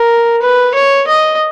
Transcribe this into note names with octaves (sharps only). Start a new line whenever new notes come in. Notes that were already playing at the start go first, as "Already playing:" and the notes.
Already playing: A#4
B4
C#5
D#5